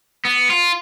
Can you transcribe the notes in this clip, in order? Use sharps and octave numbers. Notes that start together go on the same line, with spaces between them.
B3
F4